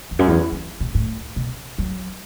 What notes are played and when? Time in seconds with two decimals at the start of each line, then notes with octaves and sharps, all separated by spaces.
0.11 E2
0.19 F#2
0.28 E2
0.52 F#2
0.80 B2
0.95 A2
1.36 B2
1.78 F#3